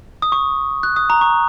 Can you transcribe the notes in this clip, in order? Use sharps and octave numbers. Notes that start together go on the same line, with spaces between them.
D#6
C#6
F#6
D#6
A#5
C#6